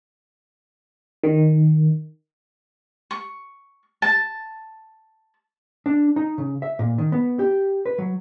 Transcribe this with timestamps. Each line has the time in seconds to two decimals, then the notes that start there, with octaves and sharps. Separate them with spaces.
1.24 D#3
3.11 C#6
4.02 A5
5.86 D4
6.16 D#4
6.38 C#3
6.62 E5
6.79 A#2
6.98 D#3
7.12 B3
7.39 G4
7.86 B4
7.98 F#3